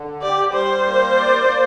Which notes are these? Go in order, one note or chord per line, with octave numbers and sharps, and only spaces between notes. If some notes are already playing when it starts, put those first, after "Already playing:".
Already playing: D3
G4 D5
G3 C5
A#3
D5
A#3